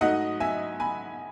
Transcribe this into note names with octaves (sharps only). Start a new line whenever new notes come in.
G#2 F#3 A3 D#4 D#5 F#5
E5 G#5
G#5 B5